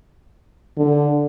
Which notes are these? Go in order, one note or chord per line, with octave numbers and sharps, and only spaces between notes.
D3